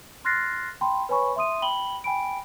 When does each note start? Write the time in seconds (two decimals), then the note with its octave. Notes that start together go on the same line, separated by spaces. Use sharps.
0.25 C6 F6 F#6 A6 A#6 C7
0.81 G5 A5 B5 C6
1.09 B4 C#5 G#5 B5 C#6
1.36 E5 C6 D#6 D#7
1.62 G5 B5 F#7 G7
2.04 G5 G#5 B5 D7